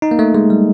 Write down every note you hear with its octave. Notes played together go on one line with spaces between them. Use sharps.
D#4
A#3
A3
G#3
G3